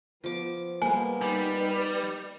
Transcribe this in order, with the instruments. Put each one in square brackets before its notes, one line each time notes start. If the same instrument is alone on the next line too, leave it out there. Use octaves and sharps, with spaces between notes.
[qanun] F3 D6 [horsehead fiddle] B3
[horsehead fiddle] G3 G#3 [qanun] A#3 B3 [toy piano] G#5
[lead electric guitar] G3 [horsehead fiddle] D#4 B4